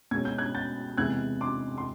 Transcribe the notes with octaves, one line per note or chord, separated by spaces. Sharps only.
B2 G#3 C#4 G#6
G6
F#6 G#6
G6 A6
E2 C3 E3 G#3 F#6 G#6
C6 D6
C6